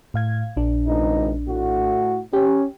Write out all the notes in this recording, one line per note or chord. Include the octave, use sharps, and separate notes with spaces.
A2 F5 G#6
A#1 D4
G#1 C#2 D#4
A2 F#4
C#4 G4